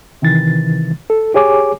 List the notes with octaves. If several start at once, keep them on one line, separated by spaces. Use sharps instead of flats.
C3 D#3 E3 A6
A4
G4 G#4 C#5 G#5 D6